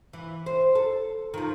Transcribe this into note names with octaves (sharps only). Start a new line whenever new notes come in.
E3
C5
A4
D#3 F3